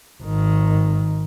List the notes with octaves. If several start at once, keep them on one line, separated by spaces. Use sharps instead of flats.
G#1 D#3